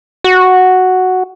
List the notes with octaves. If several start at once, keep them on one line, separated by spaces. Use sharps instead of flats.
F#4